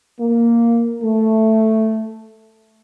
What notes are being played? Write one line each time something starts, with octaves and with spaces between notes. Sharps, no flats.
A#3
A3